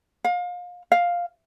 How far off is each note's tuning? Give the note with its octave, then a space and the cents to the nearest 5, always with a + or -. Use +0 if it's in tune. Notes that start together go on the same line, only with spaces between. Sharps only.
F5 +30
F5 +5